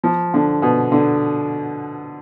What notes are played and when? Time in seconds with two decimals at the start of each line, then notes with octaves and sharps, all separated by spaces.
0.04 F3
0.34 D3
0.62 B2
0.92 D3